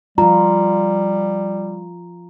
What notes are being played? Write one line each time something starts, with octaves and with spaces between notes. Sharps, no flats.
F3 G3 F4 A#5